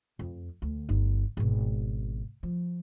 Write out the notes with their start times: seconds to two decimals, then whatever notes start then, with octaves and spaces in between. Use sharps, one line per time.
0.19 F2
0.62 D2
0.89 G1 D#4
1.37 G#1 B2
2.43 F3